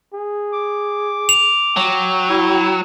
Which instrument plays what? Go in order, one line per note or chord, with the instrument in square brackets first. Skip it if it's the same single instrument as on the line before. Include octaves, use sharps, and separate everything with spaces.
[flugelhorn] G#4
[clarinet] D6
[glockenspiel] F7
[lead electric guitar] F#3 [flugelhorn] G5
[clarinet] E4